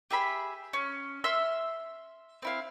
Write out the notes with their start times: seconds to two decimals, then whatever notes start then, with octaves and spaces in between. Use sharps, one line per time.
0.10 G4 G#4 E5 B5
0.73 C#4
1.24 E5 C6 E6 F6
2.42 C4 E4 F5